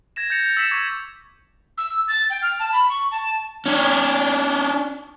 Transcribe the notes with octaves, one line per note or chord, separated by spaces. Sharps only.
G#6 A#6 E7
G6 A6 A#6 C#7 F7
A6
E6 A6 B6 E7
C#6 D6 G#6
E6
A6
G5
F6
A5
B5
C#6
A5
C#4 D4